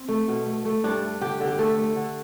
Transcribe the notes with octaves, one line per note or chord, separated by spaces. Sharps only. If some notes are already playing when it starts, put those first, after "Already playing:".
Already playing: C4
A3
B2
A3
A3
G2 D4
A3
D3 G4
D3
G4
A3 A4
A3
D3